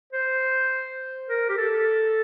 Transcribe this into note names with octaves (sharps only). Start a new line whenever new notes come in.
C5
A#4
G4
A4